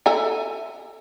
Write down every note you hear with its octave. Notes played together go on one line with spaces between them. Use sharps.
A4 E5 G#5